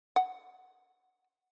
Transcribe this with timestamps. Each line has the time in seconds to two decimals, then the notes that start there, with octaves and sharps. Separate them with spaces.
0.16 F#5